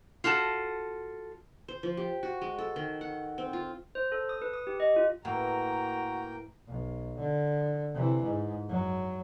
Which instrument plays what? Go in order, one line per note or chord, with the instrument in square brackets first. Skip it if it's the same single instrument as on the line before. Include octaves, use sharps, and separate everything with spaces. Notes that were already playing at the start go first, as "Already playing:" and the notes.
[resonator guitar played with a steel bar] F4 F#4 A4 A5
[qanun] C5
F3
G4
F#4
G#3
A4
D#3
F#5
C4
F4
[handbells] C5
A4
D#6
B4
D#6
G4
D#5
F4
[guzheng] A2 E3 [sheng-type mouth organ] A#3 G5 [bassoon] F#4 [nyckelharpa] A#5
[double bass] B1
D3
C3 E3
G#2
F#2 F#3